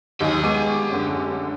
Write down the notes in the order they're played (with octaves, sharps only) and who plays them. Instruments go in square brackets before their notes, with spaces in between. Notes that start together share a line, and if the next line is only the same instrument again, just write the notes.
[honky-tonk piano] D#2 F#3 D#4 [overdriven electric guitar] G4 G#5
[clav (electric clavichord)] G#3 B3 [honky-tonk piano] C#6 D6 D#7
[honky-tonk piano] A1 F#2 D3